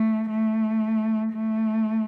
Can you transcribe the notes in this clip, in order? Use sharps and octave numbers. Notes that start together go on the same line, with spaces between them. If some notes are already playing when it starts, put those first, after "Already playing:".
Already playing: A3
A3
A3